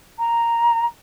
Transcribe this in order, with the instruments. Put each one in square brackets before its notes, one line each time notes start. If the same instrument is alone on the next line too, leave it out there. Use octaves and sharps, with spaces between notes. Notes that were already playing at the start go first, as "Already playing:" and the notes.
[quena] A#5